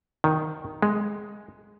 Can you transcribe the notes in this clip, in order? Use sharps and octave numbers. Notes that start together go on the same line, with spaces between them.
D#3
G#3